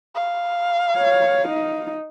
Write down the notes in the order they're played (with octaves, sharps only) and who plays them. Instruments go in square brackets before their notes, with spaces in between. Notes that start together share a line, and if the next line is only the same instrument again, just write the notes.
[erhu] F5
[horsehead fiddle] C#5
D#4